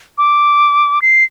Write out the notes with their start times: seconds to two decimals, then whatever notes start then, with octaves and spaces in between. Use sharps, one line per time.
0.18 D6
1.02 C7